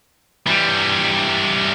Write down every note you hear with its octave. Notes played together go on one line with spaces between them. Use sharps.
E3 G3